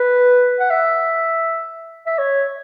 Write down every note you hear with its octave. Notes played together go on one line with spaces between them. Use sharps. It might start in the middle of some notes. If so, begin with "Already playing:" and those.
Already playing: B4
F#5
E5
E5
C#5